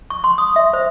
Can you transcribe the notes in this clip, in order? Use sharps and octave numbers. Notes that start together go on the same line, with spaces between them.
C#6
C6
D#6
E5
C5